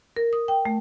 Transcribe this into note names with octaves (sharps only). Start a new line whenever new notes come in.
A#4
D#6
G5
A3